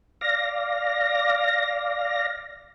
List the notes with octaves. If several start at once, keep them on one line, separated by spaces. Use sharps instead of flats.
D5 F5 A#6